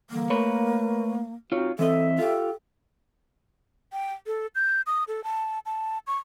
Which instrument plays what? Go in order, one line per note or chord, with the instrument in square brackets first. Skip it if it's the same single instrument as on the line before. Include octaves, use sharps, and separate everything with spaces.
[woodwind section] D3 E3 G3 [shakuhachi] A#3
[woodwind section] A3 [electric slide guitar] A#4 B4 C#5
[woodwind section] C4 D#4 F#4 [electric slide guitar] F4 C#5
[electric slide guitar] E3 C4 D#5 [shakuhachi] A4 [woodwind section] E5
[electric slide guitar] F4 G4 [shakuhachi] A4
[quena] G5
A4
G6
D#6
A4
A5
A5
C#6